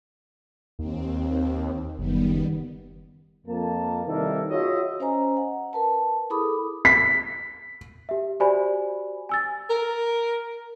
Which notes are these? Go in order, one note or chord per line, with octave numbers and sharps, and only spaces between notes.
D#2 C4
F#1 D#3 G3 B3
F2 A#3 A5
C3 D#3 E3 G3 A#3 A4
F4 F#4 G#4 C#5 D#5 E5
C#4 C5 D#5 G#5 A#5
F#5
A#4 B4 A5
E4 G#4 A4 B5 D6 D#6
B6
G4 E5
F#4 G4 C5 D5 G#5 B5
G#5 E6 A6
A#4